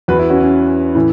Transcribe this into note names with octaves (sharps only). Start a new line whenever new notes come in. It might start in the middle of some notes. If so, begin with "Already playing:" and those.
E2 E3 F#4 B4
E4
C#4 F#4
C#4
A2 E3